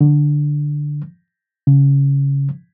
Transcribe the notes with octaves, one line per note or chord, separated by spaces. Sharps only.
D3
C#3